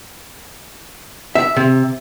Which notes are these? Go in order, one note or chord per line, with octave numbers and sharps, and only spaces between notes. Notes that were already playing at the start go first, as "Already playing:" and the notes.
E5
C3